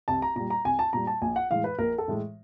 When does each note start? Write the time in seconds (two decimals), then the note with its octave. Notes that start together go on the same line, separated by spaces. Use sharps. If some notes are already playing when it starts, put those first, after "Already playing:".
0.08 C2 A5
0.22 A#5
0.36 A#2 G3 A#5
0.50 A#5
0.65 C2 G#5
0.79 A5
0.93 A#2 G3 A#5
1.07 A5
1.21 A#1 G#5
1.36 F#5
1.51 A2 E3 G#3 F5
1.64 B4
1.78 A#1 A#4
1.98 A4
2.08 A2 E3 G#3